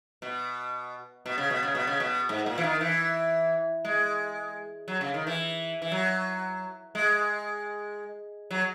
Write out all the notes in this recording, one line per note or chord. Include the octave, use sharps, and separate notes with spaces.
B2
B2
C#3
B2
C#3
B2
C#3
B2
G#2
A#2
E3
D#3
E3
G#3
F#3
C#3
D#3
E3
E3
F#3
G#3
F#3